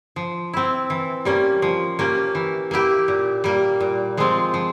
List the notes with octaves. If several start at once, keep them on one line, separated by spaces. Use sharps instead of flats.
F3
C4 E4
E3
G3 A#3 C#4
F3
A#3 C#4 G4
E3
A#3 E4 G4
A#2
G3 A#3
A#2
F3 G#3 C4 F4
F3